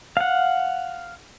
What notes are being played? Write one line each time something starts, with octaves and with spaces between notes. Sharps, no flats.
F5 F#5